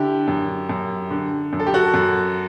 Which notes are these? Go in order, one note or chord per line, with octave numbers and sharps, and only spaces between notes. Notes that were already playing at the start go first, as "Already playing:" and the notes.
Already playing: D3 E4 G4
F#2
F#2
D3
F#2
A4
G4
F#4 A4
F#2